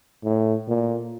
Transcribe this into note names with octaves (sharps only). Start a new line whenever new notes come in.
A2
A#2